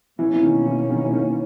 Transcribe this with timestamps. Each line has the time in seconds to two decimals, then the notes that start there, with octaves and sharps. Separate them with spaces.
0.19 B2 E3 A#3 C#4
0.33 E3
0.43 D#3
0.66 E3
0.90 D#3
1.03 E3
1.13 D#3